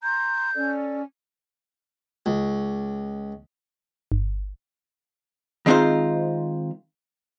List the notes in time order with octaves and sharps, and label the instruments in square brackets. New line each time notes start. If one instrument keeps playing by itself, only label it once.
[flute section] A#5 C6 [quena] G6
[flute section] C#4 A4 D5
[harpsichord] C#2
[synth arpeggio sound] G1
[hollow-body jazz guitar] D#3 G#3 C4 D#4 F4 C5